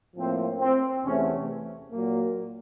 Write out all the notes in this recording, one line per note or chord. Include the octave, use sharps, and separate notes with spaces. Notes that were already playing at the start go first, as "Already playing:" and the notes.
A2 F3 A#3 C4
C4
E2 C3 E3 A3 C#4
A#2 F#3 A#3